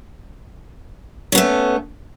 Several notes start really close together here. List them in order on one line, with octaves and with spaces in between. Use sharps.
C#4 B3 A3